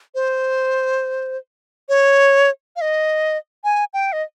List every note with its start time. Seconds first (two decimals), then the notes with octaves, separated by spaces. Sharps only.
0.15 C5
1.89 C#5
2.76 F5
2.81 D#5
3.64 G#5
3.93 G5
4.13 D#5